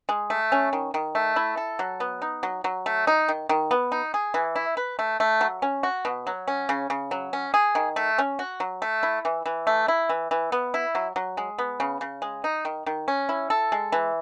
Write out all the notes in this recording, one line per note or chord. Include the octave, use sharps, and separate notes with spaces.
G#3
A3
C#4
D#3
D#3
A3
E4
A4
F#3
B3
D#4
F#3
F#3
A3
D#4
D#3
D#3
B3
D#4
G#4
E3
E4
B4
A3
A3
F#3
C#4
F#4
B2
F#3
C#4
C#3
C#3
F#3
C#4
G#4
D#3
A3
C#4
F#4
F#3
A3
E4
E3
E3
A3
E4
E3
E3
B3
E4
F#3
F#3
G#3
B3
C#3
C#3
G#3
D#4
D#3
D#3
C#4
E4
A4
G#3
E3